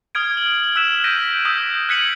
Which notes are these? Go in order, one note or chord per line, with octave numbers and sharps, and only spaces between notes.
D#6 F6 G#6 D7
F#7
E6 F#6 B6 E7
G6 A#6 B6 D7 D#7 F#7
D#6 E6 G6 B6
F#6 G#6 B6 C#7 D#7 F#7